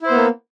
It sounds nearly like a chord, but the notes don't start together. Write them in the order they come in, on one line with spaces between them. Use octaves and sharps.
E4 C5 B3 A#3